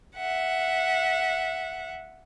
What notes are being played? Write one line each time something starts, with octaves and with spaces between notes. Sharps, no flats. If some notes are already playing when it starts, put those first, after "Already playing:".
E5 F#5